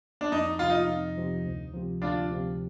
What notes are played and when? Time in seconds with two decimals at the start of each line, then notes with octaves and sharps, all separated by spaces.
0.21 D4
0.32 F2 D#4
0.59 C3 F3 F4
0.70 D#4
0.88 F2
1.17 C3 F3
1.45 D2
1.73 C3 F3
2.02 D2 D4 F4
2.31 C3 F3